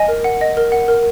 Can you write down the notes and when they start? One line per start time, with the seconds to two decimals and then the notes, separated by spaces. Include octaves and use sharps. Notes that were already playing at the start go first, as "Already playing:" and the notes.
Already playing: D#5 G#5
0.08 A#4
0.24 F#5
0.41 D#5
0.57 A#4
0.72 F#5
0.88 A#4